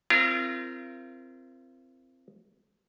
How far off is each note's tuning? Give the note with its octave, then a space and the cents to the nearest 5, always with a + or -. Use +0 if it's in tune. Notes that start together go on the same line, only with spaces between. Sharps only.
C4 +0 F4 -40 A#4 -5